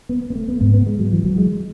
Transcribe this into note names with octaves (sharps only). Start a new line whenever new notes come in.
B3
B3
A3
B3
G#2 B3
B3
G#3
F#3
E3
F#3
G#3